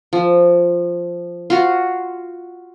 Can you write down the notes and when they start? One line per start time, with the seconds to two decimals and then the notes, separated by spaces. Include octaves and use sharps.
0.13 F3
1.50 F4 F#4